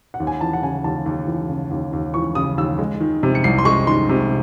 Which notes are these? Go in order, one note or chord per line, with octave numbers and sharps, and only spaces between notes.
F#5
D#2
G#5
E3 A5
F#5
C#3 G#5
D#2 A5
D#2
E3
C#3
D#2
D#2
E3 C#6
C#3 D#6
D#2 E6
G#3
D#3
C3
C#7
C2 C7
C6
G#3 C#6
D#3 C6
C3